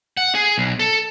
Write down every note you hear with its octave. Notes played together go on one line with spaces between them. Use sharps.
F#5
G#4
B1
A4